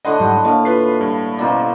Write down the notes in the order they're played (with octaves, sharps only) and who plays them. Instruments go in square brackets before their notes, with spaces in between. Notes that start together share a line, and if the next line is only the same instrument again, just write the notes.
[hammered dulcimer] A2 D3 B5 [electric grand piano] D#5 F#5 C6
[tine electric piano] G#2 F#3 G3
[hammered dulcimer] A2 F5 [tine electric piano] A#3 D4 A4
[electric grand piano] F4 B4 C7
G2
[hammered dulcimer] B2 A#3 C5 [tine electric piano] C#4 E4 D5